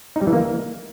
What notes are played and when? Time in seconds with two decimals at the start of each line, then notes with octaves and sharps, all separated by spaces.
0.16 D#4
0.22 G3
0.27 E3
0.33 A#3